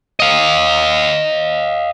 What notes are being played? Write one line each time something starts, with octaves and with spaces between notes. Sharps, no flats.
D#5 F5